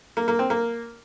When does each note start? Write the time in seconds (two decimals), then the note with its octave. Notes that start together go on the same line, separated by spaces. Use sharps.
0.17 A#3
0.28 A#3
0.39 C4
0.50 A#3